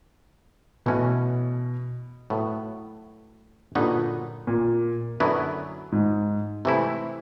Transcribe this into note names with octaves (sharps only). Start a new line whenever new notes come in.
B2 E3 A3 C#4 F#4
A2 F#3 B3
G2 A#2 D3 F#3 B3 D#4
A#2
F#2 D3 F#3 B3 E4
G#2
C3 E3 A3 C4 E4